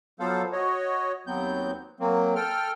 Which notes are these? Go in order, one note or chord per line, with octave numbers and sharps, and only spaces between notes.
F3 F#3 B3 A4 C5 F5
F#4 C#5 D#5
D#2 F#3 B3 C4 G6
F#3 A#3 C4
A4 G5 F6